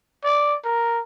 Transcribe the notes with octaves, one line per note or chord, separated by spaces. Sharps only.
D5
A#4